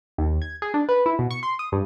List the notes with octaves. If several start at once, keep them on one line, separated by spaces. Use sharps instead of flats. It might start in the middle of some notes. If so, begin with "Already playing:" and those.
D#2
G#6
G#4
D4
B4
E4
B2
C#6
C6
D#6
G2